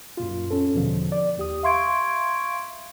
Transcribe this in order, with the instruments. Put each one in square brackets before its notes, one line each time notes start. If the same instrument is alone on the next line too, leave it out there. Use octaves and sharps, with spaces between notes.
[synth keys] F#2 A#2 F4
C#4 A4
E2 B2 D3 F3
D5
D#2 G4 D#6
E5 F5 C6 C#6 G#6 D7